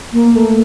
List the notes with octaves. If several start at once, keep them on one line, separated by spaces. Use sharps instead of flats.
A#3
A3